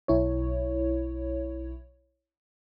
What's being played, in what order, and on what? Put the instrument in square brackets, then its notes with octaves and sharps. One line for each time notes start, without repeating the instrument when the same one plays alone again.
[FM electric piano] B1 E4 C#5